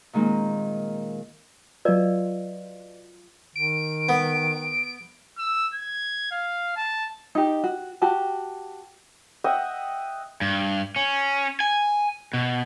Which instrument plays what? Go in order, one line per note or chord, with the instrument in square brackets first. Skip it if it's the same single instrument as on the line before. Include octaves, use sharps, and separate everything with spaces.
[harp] A#2 D#3 G#3 A#3 C4
[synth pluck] F#3 F4 [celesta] B4 D5 D#5
[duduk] D#3 [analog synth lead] D7
[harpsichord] B3
[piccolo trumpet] E6
G#6
F5
A5
[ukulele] D#4 G4
F#4
F#4 G4 A5
[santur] D#5 E5 F#5 G5
[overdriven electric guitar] G2
C#4
G#5
B2